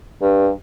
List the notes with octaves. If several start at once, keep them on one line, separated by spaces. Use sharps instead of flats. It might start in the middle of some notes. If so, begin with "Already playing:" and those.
G2